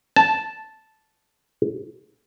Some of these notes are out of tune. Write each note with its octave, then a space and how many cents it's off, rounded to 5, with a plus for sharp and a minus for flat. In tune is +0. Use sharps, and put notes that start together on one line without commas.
A5 -5